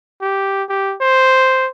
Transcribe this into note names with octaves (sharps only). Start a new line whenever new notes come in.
G4
G4
C5